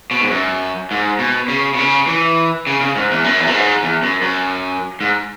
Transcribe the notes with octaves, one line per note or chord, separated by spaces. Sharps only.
B2
G#2
F#2
G#2
B2
C#3
B2
C#3
E3
C#3
C#3
G#2
E2
F#2
E2
F#2
G#2
E2
F#2
F#2
G#2